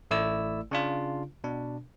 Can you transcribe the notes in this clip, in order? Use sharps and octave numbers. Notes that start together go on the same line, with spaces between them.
A1 A3 E4 D5 E6
C#3 D4 F4
B2 D4